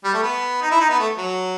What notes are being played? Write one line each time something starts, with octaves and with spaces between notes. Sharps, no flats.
G3
A3
B3
D#4
E4
D#4
B3
A3
F#3